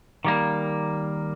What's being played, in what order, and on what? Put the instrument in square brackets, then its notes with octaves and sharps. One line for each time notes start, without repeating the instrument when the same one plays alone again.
[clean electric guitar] D#3 G3 A#3